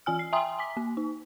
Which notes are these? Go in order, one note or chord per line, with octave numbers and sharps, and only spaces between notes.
E3 F4 G#5 F6
C7
E5 G5 G#5 A#5 C6 D#6
G#5 D6 B6
A#3
D#4